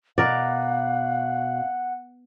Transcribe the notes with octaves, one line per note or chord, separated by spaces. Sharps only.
B2 A#4 D5 F5 F#5